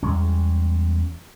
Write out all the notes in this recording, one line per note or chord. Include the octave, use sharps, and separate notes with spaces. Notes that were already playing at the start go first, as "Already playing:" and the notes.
E2 G3 G#3 C#4